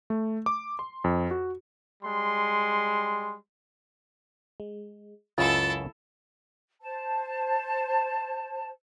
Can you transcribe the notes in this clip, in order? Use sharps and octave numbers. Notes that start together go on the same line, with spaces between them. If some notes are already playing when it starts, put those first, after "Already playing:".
A3
D6
C6
F2
F#4
G3 G#3 C6
G#3
C#2 F#2 C#3 E4 F4 A4 A6
C5 A5